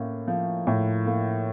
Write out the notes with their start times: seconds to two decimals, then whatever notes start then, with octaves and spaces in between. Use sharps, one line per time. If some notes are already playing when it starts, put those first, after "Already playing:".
Already playing: A2 A#3 C#4
0.28 F3
0.67 A2
1.06 A#3